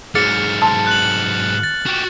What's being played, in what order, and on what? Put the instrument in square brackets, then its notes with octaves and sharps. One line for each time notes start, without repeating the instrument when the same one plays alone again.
[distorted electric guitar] G#2 F#3 [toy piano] G#4 [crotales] F6 A6 C#7
[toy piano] A5 C6
[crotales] F#6 F#7
A6
[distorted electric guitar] F#4 G4